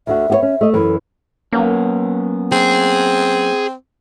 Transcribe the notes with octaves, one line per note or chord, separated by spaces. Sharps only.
D2 D3 F#4 E5
B3 G4 C#5
C#4
A3 D#5
F#2 E3 A4 B4
F#3 A#3 B3 C#4
C4 G#4